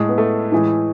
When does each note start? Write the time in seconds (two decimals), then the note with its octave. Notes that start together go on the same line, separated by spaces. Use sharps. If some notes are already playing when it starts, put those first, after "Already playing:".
Already playing: A2 G#3
0.09 B3
0.18 A3
0.52 A2 E3 G#3